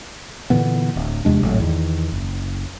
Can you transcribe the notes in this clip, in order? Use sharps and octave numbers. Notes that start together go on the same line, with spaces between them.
A#2 D3 E3 B3
D1
E2 C3 G#3 D4
G#1 A2 F#3
E2 D#3
F#1